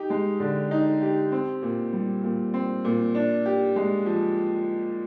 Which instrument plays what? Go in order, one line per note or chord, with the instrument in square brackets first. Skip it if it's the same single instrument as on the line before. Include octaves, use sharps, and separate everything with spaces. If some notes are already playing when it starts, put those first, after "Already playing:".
Already playing: [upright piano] D#4 G4
G#3
D3
D#4
G4
C4
A#2
G3
A#2
C4
A#2
D4
G4
G#3
F3